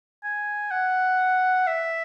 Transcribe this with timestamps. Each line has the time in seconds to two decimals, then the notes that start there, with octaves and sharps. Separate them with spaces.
0.24 G#5
0.72 F#5
1.67 E5